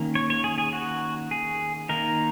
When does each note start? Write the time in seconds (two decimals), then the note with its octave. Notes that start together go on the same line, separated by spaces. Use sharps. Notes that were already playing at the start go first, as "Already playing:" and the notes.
Already playing: D#3 A#3 C#4
0.15 C#5
0.30 C#5
0.44 G#4
0.58 G#4
0.73 F#4
1.31 G#4
1.89 D#3 A#3 D#4 A#4